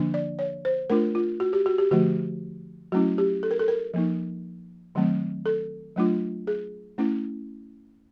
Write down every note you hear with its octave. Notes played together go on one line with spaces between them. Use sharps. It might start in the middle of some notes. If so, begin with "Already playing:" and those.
Already playing: D3 F3 A#3 D4
D5
C#5
C5
A3 D4 F4 A#4
F4
F#4
G4
F#4
G4
D3 F3 A3 F#4
F#3 A3 C#4 E4 F#4
G4
A4
A#4
A4
A#4
F3 A#3 D#4
D#3 F#3 A3 C4
A4
F#3 A3 D4 F4
G#4
A3 C#4 E4